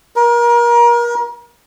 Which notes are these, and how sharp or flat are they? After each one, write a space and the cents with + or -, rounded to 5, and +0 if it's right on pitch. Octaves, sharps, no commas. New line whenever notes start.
A#4 +30